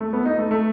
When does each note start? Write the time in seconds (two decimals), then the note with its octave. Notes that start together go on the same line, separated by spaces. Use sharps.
0.01 A3
0.13 B3
0.25 D#4
0.38 A3
0.51 A3